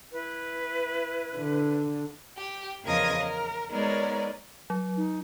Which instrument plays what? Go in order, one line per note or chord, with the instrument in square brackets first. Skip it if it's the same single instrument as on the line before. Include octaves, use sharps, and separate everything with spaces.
[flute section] E4 B4
[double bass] D3
[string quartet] G4
E2 C#3 F3 A#4 D#5 G#6
A#4
G#3 B3 D#4 A#4 C#5 D5
[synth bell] F#3
[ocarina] D#4